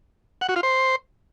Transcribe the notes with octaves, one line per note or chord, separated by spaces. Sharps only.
F#5
F#4
F4
C5